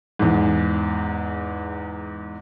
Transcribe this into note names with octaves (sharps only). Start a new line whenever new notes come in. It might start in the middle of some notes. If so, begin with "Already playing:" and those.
E2 G#2